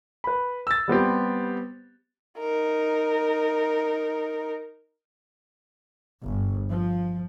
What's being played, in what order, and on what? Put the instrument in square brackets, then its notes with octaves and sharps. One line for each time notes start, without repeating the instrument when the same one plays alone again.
[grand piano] B4 B5
E6 A6
G3 B3 C4 G4
[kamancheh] D#4 A#4
[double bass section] G1
F3